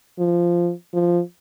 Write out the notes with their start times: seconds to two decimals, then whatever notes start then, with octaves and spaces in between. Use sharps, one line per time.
0.19 F3
0.94 F3